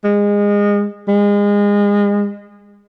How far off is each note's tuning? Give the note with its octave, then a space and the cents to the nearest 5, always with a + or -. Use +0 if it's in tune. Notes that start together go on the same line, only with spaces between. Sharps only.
G#3 -25
G#3 -30